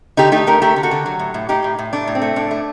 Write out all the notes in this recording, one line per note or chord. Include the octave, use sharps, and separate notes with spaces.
D3 D#4 G4
A3 D#4 G4
A3 G4 A#4
A3 G4 A#4
D3
F#4 A4
D3
F#3
A2
A2
A2 D#4 G4
A2
A2
A3 D4
A2
C4
A3
A2 D4
A3